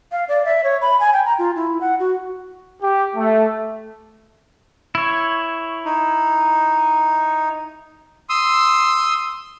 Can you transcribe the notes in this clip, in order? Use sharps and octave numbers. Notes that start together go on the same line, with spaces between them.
F5
D5
E5
C#5
B5
G#5
G5
A#5
F4
E4
F#5
F#4
G4
A3
E4 C#5
D#4
C6 D#6 E6